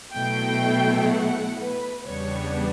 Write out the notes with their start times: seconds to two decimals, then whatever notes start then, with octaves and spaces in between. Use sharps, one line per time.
0.15 B2 F#3 A3 E4 G5
1.11 F#5
1.59 B4
2.07 E2 C#3 G3 B3 D4 C#5